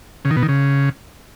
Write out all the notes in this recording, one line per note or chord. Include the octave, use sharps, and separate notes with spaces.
C#3
D#3
B2
D#3
C#3